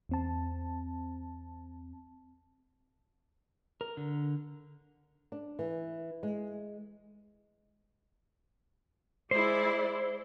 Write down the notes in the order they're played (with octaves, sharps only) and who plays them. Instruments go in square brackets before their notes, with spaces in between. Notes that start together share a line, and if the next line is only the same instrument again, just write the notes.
[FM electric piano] E2 C4 A5
[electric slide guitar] A#4
D3
[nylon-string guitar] D4
E3
G#3
[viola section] G#3 E4 D5 [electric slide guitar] C5